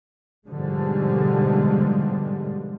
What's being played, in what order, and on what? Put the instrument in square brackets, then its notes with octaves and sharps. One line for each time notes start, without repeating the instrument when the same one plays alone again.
[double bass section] G#2 B2 D3 F3 G3 G#3